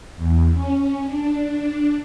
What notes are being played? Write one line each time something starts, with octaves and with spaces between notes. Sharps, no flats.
E2
C#4
D4